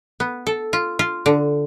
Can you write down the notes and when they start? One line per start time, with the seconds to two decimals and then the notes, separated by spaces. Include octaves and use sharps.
0.20 B3
0.47 A4
0.73 F4
0.99 F4
1.26 D3